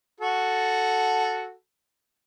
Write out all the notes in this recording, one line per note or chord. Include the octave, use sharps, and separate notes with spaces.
F#4 A4